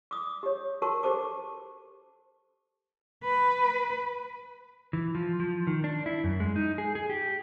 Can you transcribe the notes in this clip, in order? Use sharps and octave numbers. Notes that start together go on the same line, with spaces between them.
D6 D#6
G4 C#5
F#4 A#4 A5 C#6
G4 A4 C5 A5 D6
B4
E3
F3
F3
D#3
D4
E4
F#2
G#3
D#4
G#4
G#4
G4